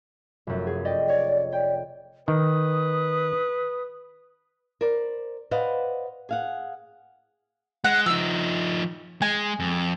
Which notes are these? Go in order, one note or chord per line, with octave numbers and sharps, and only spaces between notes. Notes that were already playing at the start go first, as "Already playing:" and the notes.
F1 F#2
G#4
D5 D#5 G5
C#5 D5
D5 G5
D#3 B4 D#6
A#4 C5 D5
B4 C5 D5 D#5 F5 F#5
G#4 F5 F#5
G#3 F#5
F3 D#4 E6
G#3 G#5
F2